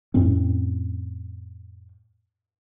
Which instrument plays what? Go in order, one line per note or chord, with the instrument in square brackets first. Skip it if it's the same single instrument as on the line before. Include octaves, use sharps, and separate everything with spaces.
[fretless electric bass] F2 A2 C4 C#4